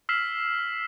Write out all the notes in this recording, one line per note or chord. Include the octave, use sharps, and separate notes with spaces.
E6 F6 B6 C7 E7 F#7